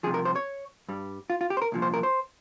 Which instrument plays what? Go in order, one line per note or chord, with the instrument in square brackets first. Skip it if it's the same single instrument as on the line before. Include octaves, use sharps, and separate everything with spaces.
[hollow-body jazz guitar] C2 C3 F3 G#4
A#4
C5
C#5
G2 G3
F4
F4
G4
C5
A#4
C2 A#2 F3
C5
A#4
C5